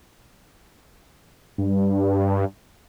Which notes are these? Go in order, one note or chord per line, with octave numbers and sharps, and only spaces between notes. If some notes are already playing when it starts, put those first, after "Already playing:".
G2